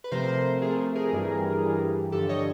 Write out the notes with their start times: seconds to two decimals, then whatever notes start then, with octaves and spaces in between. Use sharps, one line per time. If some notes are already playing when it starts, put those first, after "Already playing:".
0.04 B4
0.11 C3 F3 A3 A#4 C5
0.62 C3 F3 A3 G#4 A#4
0.95 G#4 A#4
1.13 G2 E3 G3
1.62 G2 E3 G3
2.12 G2 D3 F3 G4 A4
2.29 C#5 D#5